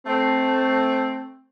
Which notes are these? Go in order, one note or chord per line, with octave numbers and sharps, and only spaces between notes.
A3 C4